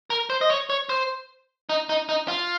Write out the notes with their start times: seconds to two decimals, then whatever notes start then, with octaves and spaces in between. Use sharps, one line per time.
0.10 A#4
0.30 C5
0.41 D#5
0.50 C#5
0.70 C#5
0.89 C5
1.69 D#4
1.89 D#4
2.09 D#4
2.28 F4